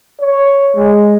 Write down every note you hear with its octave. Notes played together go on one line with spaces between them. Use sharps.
C#5
G#3